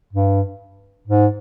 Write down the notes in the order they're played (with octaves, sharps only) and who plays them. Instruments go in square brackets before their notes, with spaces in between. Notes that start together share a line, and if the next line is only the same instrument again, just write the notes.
[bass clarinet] G2
G#2